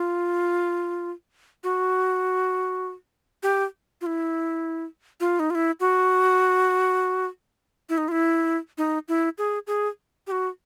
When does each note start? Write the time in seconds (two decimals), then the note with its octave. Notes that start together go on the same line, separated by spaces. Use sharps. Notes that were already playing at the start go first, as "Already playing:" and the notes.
Already playing: F4
1.64 F#4
3.43 G4
4.01 F4
4.06 E4
5.20 F4
5.40 D#4
5.50 F4
5.55 E4
5.80 F#4
7.89 E4
7.98 D#4
8.08 F4
8.12 E4
8.78 D#4
9.08 E4
9.38 G#4
9.67 G#4
10.27 G4
10.32 F#4